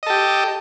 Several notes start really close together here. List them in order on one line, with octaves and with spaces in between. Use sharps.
D#5 A4 G4